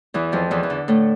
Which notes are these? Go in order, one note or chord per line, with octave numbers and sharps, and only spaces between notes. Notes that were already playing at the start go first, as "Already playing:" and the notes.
E2 E3
F2 F3
E2 E3
E3
D3
A2 A3